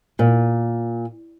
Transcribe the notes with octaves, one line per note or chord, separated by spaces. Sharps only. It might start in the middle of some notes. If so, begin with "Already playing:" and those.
A#2